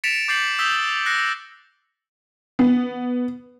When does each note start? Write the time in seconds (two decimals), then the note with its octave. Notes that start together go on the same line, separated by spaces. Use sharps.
0.04 A6 B6 C#7 D7 E7 F7
0.28 D6 G6 A6 C7 C#7 F#7
0.59 D#6 E6 G6 B6 G7
1.06 F#6 A#6 C7 C#7
2.59 B3